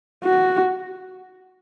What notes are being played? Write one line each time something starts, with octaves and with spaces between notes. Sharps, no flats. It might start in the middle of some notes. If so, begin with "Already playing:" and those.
F#4